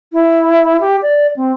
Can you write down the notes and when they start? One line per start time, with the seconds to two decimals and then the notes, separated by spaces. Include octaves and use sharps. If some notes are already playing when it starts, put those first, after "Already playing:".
0.13 E4
0.81 G4
1.02 D5
1.36 C4